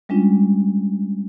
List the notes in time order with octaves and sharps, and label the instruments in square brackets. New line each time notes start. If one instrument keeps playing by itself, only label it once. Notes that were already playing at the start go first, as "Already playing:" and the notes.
[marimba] G3 G#3 C#4 D4 F4